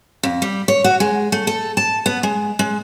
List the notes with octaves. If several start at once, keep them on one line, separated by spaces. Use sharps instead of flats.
F2
G3
C#5
F#4
G#3
A3
A4
A5
B3
G#3
G#3